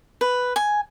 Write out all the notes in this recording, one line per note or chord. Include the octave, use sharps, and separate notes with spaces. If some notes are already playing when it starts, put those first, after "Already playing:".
B4
G#5